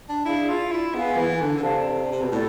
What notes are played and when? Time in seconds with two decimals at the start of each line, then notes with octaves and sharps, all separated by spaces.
0.09 D4
0.25 D4 E4 G#4 D5 F5
0.49 F4
0.71 E4
0.94 B3 G#4 B4 F5 G#5
1.17 E3
1.41 D3
1.57 D3
1.63 C3 A4 D5 F5 A5
2.12 C3
2.22 B2
2.32 A2 A4 D5